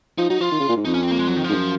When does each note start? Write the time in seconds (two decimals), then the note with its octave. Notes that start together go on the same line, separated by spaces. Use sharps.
0.18 F3 D#4
0.30 F#3 D#4
0.40 F3 F4
0.52 D#3
0.60 C#3
0.69 A#2
0.77 G#2
0.85 F2 D#4
0.94 C#4
1.03 C4
1.11 A#3
1.19 G#3
1.28 F#3
1.36 D#3
1.44 G#2 F3
1.52 F#2